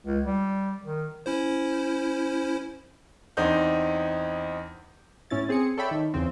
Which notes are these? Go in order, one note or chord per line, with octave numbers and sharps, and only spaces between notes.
C#2
G3
D#3
C#4 E4 C5
E2 C4 D4 D#4 G6
A2 C#4 E4 A6
C4 G#4 D#6 C#7
A4 C#5 D5 E5 G5 B5
D#3
E2 C#3 C4